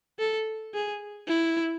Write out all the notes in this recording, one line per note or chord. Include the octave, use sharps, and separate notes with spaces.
A4
G#4
E4